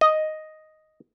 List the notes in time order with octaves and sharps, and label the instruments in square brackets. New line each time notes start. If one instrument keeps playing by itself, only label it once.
[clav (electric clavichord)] D#5